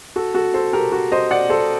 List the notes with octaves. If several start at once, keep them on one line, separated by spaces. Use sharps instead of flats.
F#4 A4
F#4 A4
A4 C5
G4 A#4
F#4
C5 D#5
D5 F#5
A4 C5